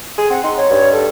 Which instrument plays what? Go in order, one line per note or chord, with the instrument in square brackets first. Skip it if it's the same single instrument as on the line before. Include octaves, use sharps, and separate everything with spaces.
[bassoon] G#4
[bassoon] C4 [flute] F#5
[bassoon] D#4 [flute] C6
[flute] C#5
[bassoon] G2
[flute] A4